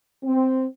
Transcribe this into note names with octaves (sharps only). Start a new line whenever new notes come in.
C4